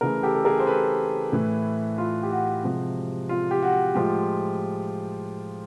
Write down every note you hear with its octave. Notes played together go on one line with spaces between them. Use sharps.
C#3 E3 A3 G#4 A#4
G4 A4
A4
G#4 A#4
C5
A4 B4
A2 E3 A3
F4
G4
F#4
C3 F3 G#3
F4
G4
F#4
A2 F3 G#3 F4 G4